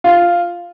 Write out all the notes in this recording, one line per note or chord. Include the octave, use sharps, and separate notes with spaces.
F4